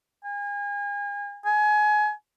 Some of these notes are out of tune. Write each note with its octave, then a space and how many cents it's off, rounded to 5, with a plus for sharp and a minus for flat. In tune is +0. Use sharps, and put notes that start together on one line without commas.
G#5 -35
G#5 +25